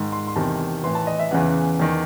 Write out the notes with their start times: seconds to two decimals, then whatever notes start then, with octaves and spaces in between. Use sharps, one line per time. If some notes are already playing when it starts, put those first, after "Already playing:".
Already playing: G#2 D#3
0.12 C6
0.27 C6
0.36 E2 C3 D#3 A5
0.84 A2 E3 C6
0.95 A5
1.07 D#5
1.19 E5
1.31 E2 C#3 E3 F#5
1.79 E2 D#3